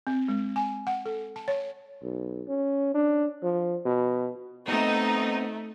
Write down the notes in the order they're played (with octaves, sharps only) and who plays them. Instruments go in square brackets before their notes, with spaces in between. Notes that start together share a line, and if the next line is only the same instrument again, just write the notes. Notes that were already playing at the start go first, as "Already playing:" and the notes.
[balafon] C4
G#3
G#5
F#5
A4
A5
C#5
[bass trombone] B1
C#4
D4
F3
B2
[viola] A3 [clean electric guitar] B3 C4 [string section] D#4